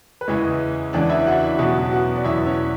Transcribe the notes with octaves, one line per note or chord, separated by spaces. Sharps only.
B4
E2 C#3 E3 G#3 C#4 C#5
E2 C#3 E3 G#3 C#4 D4 D5
E4 E5
F#4 F#5
E4 E5
E2 B2 F#3 C#4 F#4 F#5
F#4 F#5
D5
E2 B2 F#3 C#4 E4 E5
C#4 C#5